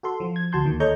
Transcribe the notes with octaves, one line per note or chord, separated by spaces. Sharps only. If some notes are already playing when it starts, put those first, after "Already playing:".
F#4 A4 C6
F3
G#6
D2 F#4 A5 C6 G6
D#2 D#3
A4 C#5 D#5 A#5 C#6 G6